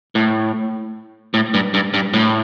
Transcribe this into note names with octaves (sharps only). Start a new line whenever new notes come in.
A2
A2
G2
G2
G2
A2